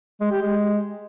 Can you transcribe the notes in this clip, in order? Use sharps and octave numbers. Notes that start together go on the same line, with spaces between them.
G#3
G4
G#3